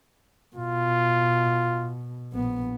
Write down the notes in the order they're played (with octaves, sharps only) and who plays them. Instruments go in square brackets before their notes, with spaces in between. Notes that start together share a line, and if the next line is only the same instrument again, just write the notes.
[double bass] B2 [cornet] F4
[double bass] A#1 B3